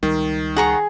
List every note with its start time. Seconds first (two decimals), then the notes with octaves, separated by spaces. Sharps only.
0.03 C#2 D#3 G3
0.56 G#4 F#5 A#5 C#6